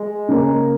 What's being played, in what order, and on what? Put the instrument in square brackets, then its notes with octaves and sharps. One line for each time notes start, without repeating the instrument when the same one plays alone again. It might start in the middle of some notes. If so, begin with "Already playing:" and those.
Already playing: [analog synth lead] G#3
[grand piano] C#3 A#3 C#4 A#4